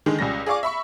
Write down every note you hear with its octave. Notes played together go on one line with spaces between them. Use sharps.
D3 D#3 G#3
C#2 G3 C#4 A#6
G#4 D5 F5 C#6 D6
E5 B5 C#6